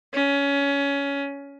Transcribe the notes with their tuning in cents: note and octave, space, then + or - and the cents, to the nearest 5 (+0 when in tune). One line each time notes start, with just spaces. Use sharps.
C#4 +20